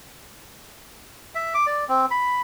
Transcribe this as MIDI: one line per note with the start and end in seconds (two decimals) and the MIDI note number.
1.35 1.54 76
1.54 1.66 86
1.67 1.85 74
1.89 2.06 60
2.11 2.42 83